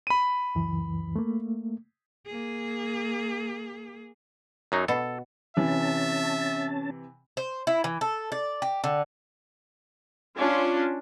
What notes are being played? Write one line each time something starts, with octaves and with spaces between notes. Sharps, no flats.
B5 D#7
C#2 F#2 E3
A3 A#3
A#3 G#4
F#2 F#3 D#4
B2 A4
C3 E3 C#4 E5 A5
C5
E4
E3
A4
D5
G4
D3
C#4 D4 F4